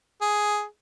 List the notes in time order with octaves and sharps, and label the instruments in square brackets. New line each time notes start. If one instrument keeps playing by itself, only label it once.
[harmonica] G#4